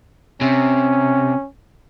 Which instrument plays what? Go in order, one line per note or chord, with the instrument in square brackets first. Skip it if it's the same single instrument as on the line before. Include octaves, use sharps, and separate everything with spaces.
[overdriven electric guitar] C3 [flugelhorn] C#4